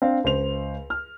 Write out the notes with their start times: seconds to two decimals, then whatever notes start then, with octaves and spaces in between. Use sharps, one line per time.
0.02 C4 D4 F5
0.24 C#2 C5 F7
0.90 F6